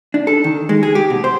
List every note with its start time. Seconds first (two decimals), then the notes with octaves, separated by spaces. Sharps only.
0.14 D4
0.27 A4
0.44 D#3
0.69 G#3
0.83 G#4
0.95 G4
1.10 B2
1.24 C5